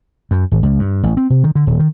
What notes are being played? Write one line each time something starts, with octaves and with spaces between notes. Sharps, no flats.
F#2
G#1
C#2
G2
A1
C4
C3
D#3
D3
D#1
D#3